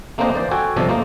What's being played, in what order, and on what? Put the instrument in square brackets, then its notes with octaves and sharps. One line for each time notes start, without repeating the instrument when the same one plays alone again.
[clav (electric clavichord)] A3 A#3 C4 D4 C5 D#5
E3 C5 D5
F#4 A4 G5 G#5
G1 C3 F3 A4 D5 D#5
A3 A#3 C5 D#5